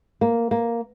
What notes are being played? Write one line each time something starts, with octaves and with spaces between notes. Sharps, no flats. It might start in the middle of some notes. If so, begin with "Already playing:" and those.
A#3
A#3